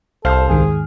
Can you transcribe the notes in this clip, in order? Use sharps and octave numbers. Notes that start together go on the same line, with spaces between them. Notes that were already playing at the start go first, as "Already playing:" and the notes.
C2 A4 C5 F5 F6
D#2 G#2 D#3 G#4